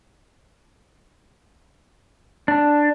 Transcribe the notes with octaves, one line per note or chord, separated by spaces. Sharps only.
D4